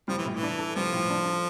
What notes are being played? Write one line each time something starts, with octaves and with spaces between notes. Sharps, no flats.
F3 G3
E3
A2
E3
D4
A4
F3 G3
A2
D4
A4